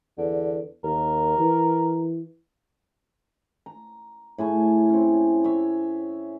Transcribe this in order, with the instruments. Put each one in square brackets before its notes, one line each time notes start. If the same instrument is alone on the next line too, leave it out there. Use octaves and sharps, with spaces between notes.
[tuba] E2 [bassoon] D3
[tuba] D#2 [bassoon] A#4
[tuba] E3
[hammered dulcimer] A#5
A2 G#4 C#6
C4 C#4
C#5 E5